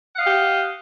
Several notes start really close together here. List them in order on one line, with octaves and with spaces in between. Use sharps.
F#5 F5 D#5 G4